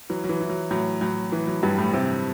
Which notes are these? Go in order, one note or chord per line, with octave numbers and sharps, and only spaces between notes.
E3 F#3
F#3
E3
E3
F#3
A2 F#3
A2 F#3
E3
F#3
G2 E3 G3
A2 A3
A2 C3 C4